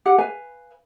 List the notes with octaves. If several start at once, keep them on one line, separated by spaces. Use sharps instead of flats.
G4 F#5
B4 F5 G#5